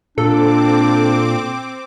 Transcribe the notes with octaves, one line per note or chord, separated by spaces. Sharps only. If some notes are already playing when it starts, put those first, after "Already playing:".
A#2 C4 D4 A4 D6